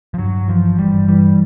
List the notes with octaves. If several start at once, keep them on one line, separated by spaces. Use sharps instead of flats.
F3
G2 F#3
G2
E3 F3
G1
E3 G3
G2
E3 G3